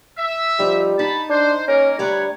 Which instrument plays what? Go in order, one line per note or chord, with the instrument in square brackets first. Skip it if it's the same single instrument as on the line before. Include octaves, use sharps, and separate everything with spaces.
[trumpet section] E5
[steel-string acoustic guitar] F3 D#4 [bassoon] G3
[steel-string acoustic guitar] D#4 [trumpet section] A5 B5
[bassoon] D4 [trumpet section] C5
[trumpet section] A#3 A#4 C#5 [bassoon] C#4
[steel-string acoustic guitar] D2 D5 A#5 [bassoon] G3 [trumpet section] B4 C#5